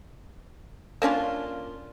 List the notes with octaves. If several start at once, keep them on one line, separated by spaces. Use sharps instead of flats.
A#3 C#4 D4 F4